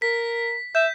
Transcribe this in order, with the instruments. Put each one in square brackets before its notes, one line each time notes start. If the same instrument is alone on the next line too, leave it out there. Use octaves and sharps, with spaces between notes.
[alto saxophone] A#4 [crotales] B6
[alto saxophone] E5 [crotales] G6